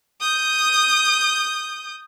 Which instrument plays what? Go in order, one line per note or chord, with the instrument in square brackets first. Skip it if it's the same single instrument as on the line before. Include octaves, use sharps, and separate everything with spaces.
[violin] D#6 G6